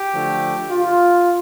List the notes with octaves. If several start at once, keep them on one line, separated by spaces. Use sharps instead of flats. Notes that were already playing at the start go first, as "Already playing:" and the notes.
Already playing: G4
D3 F3 A3
F4